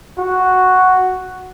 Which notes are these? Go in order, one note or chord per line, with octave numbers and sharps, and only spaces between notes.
F#4